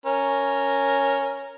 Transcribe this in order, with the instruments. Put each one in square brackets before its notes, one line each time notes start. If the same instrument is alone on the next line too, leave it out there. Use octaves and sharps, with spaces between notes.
[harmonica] C#4 A#4